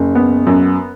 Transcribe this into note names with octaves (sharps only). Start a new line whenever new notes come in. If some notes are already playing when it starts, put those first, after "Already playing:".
Already playing: F#1
B3
F#2